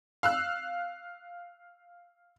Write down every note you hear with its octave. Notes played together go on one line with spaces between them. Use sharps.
F5 E6 F#6